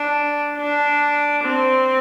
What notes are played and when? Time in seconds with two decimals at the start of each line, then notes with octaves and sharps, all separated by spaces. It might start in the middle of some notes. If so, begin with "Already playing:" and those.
Already playing: D4
0.57 D4
1.44 C4